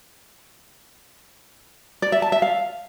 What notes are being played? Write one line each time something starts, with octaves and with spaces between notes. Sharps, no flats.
D5
E5
A5
E5
F5